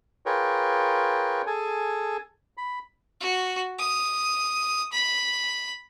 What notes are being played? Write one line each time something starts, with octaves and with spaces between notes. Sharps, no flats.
F4 G#4 A#4 B4 C#5 G5
G#4 A4 G#5
B5
F#4
D#6
B5